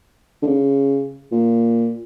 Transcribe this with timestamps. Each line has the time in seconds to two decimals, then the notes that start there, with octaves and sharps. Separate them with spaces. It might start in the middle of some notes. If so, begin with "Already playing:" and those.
0.42 D3
0.47 C#3
1.32 A#2